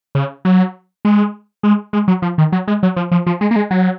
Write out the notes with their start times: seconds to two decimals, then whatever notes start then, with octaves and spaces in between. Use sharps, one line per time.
0.15 C#3
0.45 F#3
1.05 G#3
1.63 G#3
1.93 G#3
2.08 F#3
2.22 F3
2.38 D#3
2.52 F#3
2.68 G#3
2.83 F#3
2.96 F3
3.11 F3
3.26 F3
3.41 G#3
3.51 A#3
3.56 G#3
3.71 F#3